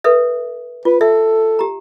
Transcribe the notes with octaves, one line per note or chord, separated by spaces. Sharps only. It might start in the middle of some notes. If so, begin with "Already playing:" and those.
A4 B4 E5
F4 B4
A4 E5
G4 A#5